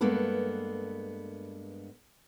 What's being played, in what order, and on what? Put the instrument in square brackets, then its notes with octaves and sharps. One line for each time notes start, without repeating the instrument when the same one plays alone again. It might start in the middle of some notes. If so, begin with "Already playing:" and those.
[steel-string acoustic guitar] G2 G#3 A#3 B3 A4 B4